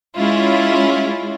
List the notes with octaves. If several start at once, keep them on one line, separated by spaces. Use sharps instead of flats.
G#3 C#4 E4 F4